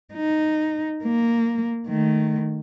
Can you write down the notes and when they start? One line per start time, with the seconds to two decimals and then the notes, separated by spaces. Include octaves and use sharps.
0.14 D#4
1.04 A#3
1.88 D#3 A3